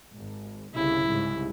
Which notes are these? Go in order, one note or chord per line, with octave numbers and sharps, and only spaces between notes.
G#1
G1 C2 C#3 E4
C2 G#2 C#3